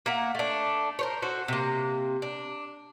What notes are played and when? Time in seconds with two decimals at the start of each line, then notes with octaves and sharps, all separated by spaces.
0.06 A#3 E5 F#5
0.35 A3 D4
0.99 A#4 C5 C#5
1.22 C#4 F#4 A4 C5
1.48 C3 A#3
2.22 D4